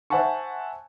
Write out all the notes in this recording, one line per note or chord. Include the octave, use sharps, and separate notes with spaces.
C5 E5 F#5 G#5 A5 C#6